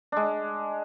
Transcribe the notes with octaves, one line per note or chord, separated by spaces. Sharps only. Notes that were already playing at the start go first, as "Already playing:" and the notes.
G#3 D4